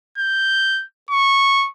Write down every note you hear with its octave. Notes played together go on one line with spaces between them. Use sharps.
G6
C#6